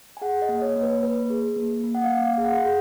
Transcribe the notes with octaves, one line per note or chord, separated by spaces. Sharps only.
G#5
G#4 F#5
D#5
A#3
C#5
A#3
B4
A#3 B4
G#4
A#3
A#3
F#5
F5
A#3
F5
G#4
F#5
G#4